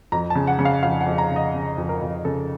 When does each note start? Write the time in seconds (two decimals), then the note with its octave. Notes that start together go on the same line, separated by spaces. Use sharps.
0.12 F2 A#5
0.30 A5
0.35 C#3
0.47 F#5
0.59 C#3
0.65 F5
0.83 F2 F5
1.01 F#5
1.06 F2
1.18 A#5
1.30 C#3
1.36 D#5
1.54 C#3
1.78 F2
1.89 A#4
2.01 F2
2.25 C#3 A4